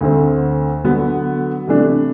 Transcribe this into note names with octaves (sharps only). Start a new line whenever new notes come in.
D2 D3 A3 C4
D3 F#3 B3
C3 E3 A3 D4